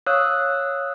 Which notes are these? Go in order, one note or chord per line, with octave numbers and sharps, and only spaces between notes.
C#5 F5 D#6 E6 F#6 G6